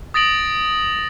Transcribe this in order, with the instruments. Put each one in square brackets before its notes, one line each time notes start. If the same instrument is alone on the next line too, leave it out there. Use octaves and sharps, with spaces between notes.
[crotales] D#6 A6 A#6 D7 F#7